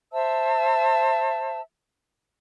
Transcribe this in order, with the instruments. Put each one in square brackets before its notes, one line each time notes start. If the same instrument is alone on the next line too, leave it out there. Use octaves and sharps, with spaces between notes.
[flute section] C5 E5 A5 E6